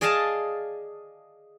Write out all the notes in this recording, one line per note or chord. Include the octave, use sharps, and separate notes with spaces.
G#4 D5 D#5 F5 G#5 A5